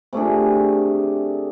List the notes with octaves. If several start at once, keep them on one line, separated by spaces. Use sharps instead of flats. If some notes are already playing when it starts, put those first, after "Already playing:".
C3 A3 D4 G#4